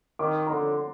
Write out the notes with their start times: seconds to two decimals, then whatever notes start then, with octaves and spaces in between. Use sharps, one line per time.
0.19 D#3 D6
0.47 A#5
0.51 D3 C6